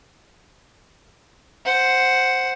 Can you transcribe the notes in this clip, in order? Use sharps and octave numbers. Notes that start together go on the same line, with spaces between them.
C5 F#5